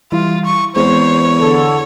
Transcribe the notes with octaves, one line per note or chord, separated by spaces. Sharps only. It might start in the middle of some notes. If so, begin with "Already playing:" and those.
E3 G3 E4 F4
C#6
E2 G#3 C4 C5 C#5
D3 A4